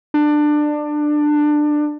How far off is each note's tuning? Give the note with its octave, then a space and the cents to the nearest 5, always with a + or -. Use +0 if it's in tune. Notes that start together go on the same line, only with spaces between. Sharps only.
D4 +20